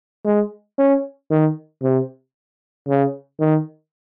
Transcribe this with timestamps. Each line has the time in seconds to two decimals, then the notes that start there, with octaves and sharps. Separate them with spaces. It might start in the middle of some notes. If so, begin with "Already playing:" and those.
0.25 G#3
0.78 C#4
1.31 D#3
1.82 C3
2.88 C#3
3.40 D#3